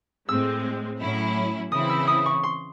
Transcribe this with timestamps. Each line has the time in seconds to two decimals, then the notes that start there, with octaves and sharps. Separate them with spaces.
0.29 A2 G#3 C4 E6
1.00 A2 F#3 C#4 E4
1.72 C#3 E3 C4 E4 D#6
1.89 E6
2.07 D#6
2.26 C#6
2.43 C6